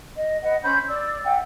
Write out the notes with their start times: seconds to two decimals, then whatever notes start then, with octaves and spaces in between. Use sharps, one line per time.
0.16 D#5
0.41 B4 D#5 F#5
0.63 C#4 C5 B5 G6
0.87 D5 E6
1.24 E5 F#5 G5 E6